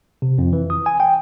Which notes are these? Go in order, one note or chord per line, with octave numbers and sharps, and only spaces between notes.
C3
F2
E3
D#6
G#5
G5